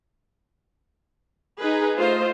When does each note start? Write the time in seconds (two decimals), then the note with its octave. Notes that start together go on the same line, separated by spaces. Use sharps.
1.59 D#4 G#4 B4
1.98 A3 F4 C5 D#5